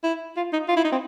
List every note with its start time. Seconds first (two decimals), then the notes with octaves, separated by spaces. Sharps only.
0.03 E4
0.36 F4
0.53 D#4
0.68 F4
0.76 E4
0.84 D#4
0.92 C4